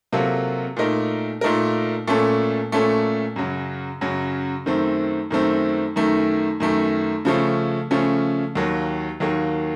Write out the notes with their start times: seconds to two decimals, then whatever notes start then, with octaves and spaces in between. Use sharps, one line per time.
0.13 C3 F#3 A#3 F4 A4
0.77 A#2 A3 D#4 A#4
1.41 A#2 A3 D#4 A#4
2.07 A#2 A3 C#4 A4
2.72 A#2 A3 C#4 A4
3.36 F#2 C#3 F#3
4.01 F#2 C#3 F#3
4.66 F#2 D#3 A3 C4
5.31 F#2 D#3 A3 C4
5.96 F#2 D#3 A3
6.60 F#2 D#3 A3
7.25 C#3 F3 A3 C#4
7.91 C#3 F3 A3 C#4
8.55 D#2 D#3 F#3 A#3
9.20 D#2 D#3 F#3 A#3